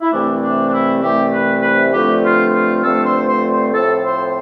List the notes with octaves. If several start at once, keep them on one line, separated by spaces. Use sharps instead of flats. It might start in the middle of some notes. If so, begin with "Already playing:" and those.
E4
C2 C3 E3 A3 C4 D4
D4
D4
E4
C2 C3 E3 A3 C4 G4
B4
B4
G2 D3 F3 A3 C4 G4
F4
F4
G2 D3 F3 A3 C4 A4
C5
C5
C5
A2 F3 C4 A4
C5